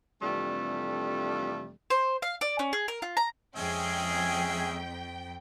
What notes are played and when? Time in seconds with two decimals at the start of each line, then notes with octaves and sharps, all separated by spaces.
0.22 F2 C3 E3 G3 A3 D4
1.90 C5
2.22 F5
2.41 D5
2.59 C#4
2.73 G#4
2.88 A#4
3.02 F4
3.17 A#5
3.56 F2 G#3 C#4 G#4 E5 G5